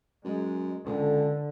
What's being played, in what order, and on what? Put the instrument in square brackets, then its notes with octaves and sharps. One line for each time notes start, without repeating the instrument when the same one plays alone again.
[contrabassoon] F#2 [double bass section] G#3
[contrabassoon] C#2 [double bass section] D3